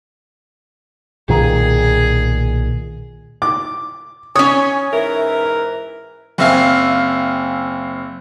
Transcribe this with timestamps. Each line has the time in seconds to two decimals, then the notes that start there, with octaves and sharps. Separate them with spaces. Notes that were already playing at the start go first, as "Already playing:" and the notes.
1.29 B1 A#2 D#3 G#4
3.42 D6
4.36 C#4 C#5 G#5 D#6
4.93 G#2 E3 A#4 E5
6.38 F#1 C4 E5 F5 G#5